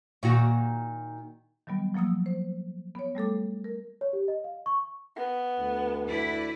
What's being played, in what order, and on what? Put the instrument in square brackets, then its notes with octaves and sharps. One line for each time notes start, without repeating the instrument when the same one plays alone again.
[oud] A#2 D#3 F#4
[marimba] D#3 F#3 G3 B3
F3 F#3 A#3 D#6 E6
C5
B3 C#5
G3 A3 A4 D6
A#4
[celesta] C#5
G4
D#5
F5
C#6
[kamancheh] B3
[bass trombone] D2
[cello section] E4 B4 D5